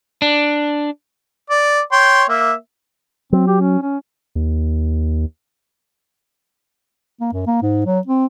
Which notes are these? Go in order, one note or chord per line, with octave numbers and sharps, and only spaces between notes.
D4
D5
C#5 G5 C6
A#3 E5
F#3 C4
G4
C#4
C#4
D#2
A#3
F#2
A#3
G#2
F#3
C4